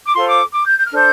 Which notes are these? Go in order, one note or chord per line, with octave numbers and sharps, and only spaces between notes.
D6
F4 A4 C5 C6
D6
D6
G6
G6
F6
D4 A4 C5 G6